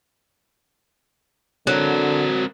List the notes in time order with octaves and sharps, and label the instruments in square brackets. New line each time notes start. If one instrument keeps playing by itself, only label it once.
[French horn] D3 [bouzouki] F#3 [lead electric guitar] C4 A#4